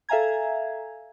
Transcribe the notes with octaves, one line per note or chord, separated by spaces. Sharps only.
A4 E5 F5 G#5 A#5 G#6